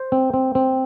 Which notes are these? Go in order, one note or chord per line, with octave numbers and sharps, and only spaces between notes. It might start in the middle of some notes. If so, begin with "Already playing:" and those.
Already playing: C5
C4
C4
C4